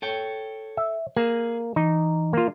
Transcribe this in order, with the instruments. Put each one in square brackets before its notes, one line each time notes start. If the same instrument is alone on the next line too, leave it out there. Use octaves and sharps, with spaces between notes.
[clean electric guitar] A4 C#5 G5
[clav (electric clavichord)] E5
[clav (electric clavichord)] A#3 [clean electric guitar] G#4
[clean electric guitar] E3 [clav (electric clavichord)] D#4
[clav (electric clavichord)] A#3 F4